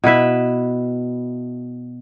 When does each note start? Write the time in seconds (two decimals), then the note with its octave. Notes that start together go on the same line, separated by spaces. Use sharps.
0.04 B2 E4 B4 E5